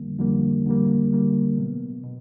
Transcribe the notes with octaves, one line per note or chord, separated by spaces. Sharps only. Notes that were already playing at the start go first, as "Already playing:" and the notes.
Already playing: F2 D3 G3 A#3
F2 D3 G3 A#3
F2 D3 G3 A#3
F2 D3 G3 A#3
B2 F#3 B3
B2